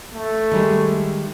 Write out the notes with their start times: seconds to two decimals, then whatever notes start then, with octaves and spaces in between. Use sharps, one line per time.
0.14 A3
0.51 D#3 G3 G#3